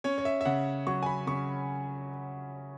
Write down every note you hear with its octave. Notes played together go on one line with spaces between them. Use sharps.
C#4 C#5
C#5
E5
E5
C#3 F#5
F#3 C#6
G#5
B5
C#3 C#6